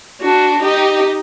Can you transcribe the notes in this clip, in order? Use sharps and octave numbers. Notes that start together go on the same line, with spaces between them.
D4 F#4
D#4 G4